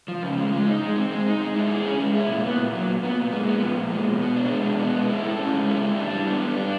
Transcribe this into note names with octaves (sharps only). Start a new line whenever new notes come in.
F3
C#3
G#3
G#3
D#4
G#3
C4
G#3
D#4
G#3
E4
G#4
C#4
G#3
E4
A#2
B3
A#2
F#3
A#2
B3
A#2
G#3
B3
F3
A#2
G#3
B2
B3
D4
G#3
B2
B3
G#3
E4
A4
C#4
G#3
E4
G3
D4
G3
B3
G3
D4